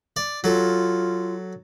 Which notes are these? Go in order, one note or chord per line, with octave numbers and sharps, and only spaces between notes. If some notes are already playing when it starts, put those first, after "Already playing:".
D5
F#3 F4 A4